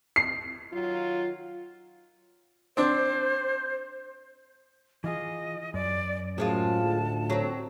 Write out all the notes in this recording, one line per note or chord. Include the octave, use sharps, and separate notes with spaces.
C7
D#3 F#3 F4
C4 D4 C5
E3 F4 G#4 D#5
F#2 D5
F#2 A2 F3 G#3 F4 A5
D2
F#3 C4